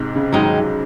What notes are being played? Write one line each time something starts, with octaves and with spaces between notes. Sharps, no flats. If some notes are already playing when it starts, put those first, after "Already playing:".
Already playing: G#2 C3
C#3
G#2 D#3 F#3 G#3 D#4